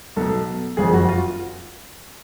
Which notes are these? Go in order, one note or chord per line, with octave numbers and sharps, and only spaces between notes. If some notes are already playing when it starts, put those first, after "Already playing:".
B1 B2 A4
F#1 F2 F3 G#4
F#4
F4